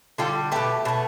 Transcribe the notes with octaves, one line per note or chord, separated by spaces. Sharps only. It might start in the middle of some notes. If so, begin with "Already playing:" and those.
D3 G3 F4 A4
B2 A3 G4 B4
B2 A3